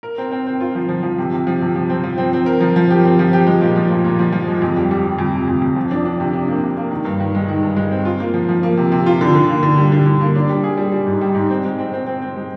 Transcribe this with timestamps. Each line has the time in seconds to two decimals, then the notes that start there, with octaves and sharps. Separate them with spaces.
0.03 A#4
0.18 C4
0.31 C4
0.47 C4
0.61 F4
0.75 F3
0.89 F3
1.03 F3
1.18 C3
1.33 C3
1.47 F3
1.61 C3
1.76 F3
1.89 C4
2.04 F3
2.18 C4
2.33 C4
2.46 A#4
2.61 F3
2.76 F3
2.90 G4
3.04 C4
3.19 F3
3.33 G4
3.47 G#3
3.62 A#2
3.76 F3
3.90 A#2
4.04 A#2
4.19 F3
4.33 F3
4.48 G#3
4.62 F2
4.77 G3
4.91 G3
5.04 G3
5.19 F2
5.33 C3
5.48 F2
5.62 F2
5.76 F3
5.91 D4
6.06 D4
6.20 C3
6.33 D4
6.48 A#3
6.63 C3
6.77 A#3
6.91 D#3
7.05 G2
7.20 D#3
7.35 G#3
7.48 D#3
7.63 G2
7.76 G#3
7.91 C4
8.05 F4
8.20 A#3
8.34 F3
8.49 F3
8.63 A#3
8.77 C3
8.92 C3
9.06 F4
9.21 D3
9.35 D3
9.50 A#3
9.63 D3
9.78 G3
9.92 D3
10.06 D3
10.21 A#3
10.36 D4
10.49 G3
10.64 G#4
10.77 G3
10.92 G3
11.06 G#2
11.21 G3
11.35 G#2
11.50 C4
11.65 G#3
11.79 C4
11.93 C4
12.06 C4
12.21 C4
12.36 G#3